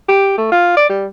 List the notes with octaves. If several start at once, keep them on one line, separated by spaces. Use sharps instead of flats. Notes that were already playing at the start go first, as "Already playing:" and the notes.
G4
A3
F4
D5
G3